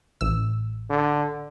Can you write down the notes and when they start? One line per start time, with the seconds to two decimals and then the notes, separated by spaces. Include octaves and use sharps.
0.21 A1 E6
0.90 D3